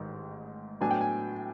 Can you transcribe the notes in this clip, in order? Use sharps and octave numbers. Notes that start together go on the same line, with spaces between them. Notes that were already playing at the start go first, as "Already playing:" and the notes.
Already playing: A1 G#2 D#3
A2 F#3 B3 D4 G#5
G5
G#5